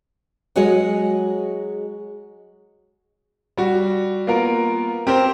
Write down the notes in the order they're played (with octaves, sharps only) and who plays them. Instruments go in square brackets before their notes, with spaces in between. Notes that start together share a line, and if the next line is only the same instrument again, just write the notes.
[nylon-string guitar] F#3 G#3 F#4 G#4 C#5 D#5
[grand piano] G3 F#4
A#3 B3 F4 A#4
C4 G4 A#4 C5